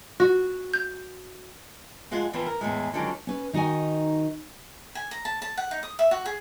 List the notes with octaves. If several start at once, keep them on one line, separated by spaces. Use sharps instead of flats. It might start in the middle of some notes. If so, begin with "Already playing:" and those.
F#4
G6
F2 G#3 F4 F#5 G#5
E2 E3 F3 C4
A#4
E2 A2 G#3
F2 D3 D#3 F#3 G#3 C#4
C#4 B4
D#3 D#4 F#4 D#5 G#5
G#5
A#5
A5
A5
F#5
D#4
D#6
E5
F#4
G#4